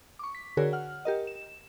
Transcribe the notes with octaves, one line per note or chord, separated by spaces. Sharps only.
C#6 D6
B6
D3 F#4 G#4 A#4 C#5
F#5 F6
G4 A#4 D#5
E7